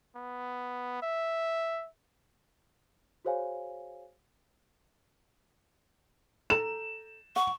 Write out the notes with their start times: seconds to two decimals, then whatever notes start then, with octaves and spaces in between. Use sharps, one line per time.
0.15 B3
1.02 E5
3.25 F#4 G#4 C5 C#5 F5 G#5
6.50 A4 A#5 E7
7.36 F#5 C#6